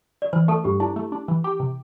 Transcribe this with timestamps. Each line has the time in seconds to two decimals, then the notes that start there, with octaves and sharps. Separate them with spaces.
0.22 D5
0.33 E3 C5
0.48 A3 A4
0.64 G2 G4
0.80 D4 E4
0.96 A3
1.12 D4
1.28 E3
1.44 G4
1.60 C3